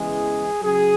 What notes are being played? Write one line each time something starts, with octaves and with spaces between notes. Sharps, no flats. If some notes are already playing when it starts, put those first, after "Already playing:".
Already playing: E2 C#3 E3 G#3 G#4
C#3 F#3 G#4